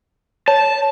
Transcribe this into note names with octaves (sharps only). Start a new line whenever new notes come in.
C#5 A5